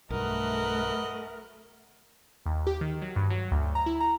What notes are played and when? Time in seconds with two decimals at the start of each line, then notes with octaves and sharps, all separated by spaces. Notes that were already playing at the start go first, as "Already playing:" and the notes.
0.10 B1 G2 A3 F#4 A#4 B4 D#5
2.46 D#2
2.67 G4
2.81 D#3
3.02 F#3
3.16 G2
3.30 F#3
3.52 D2
3.75 A#5
3.86 E4
4.00 A#5